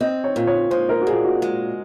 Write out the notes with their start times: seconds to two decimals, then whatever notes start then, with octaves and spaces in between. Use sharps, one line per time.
0.01 C4 D#5
0.24 C#5
0.36 A#2
0.47 C#5
0.71 G#3 C5
0.89 A#4
1.02 F#4
1.07 A#2 G#4
1.25 F#4
1.42 G#3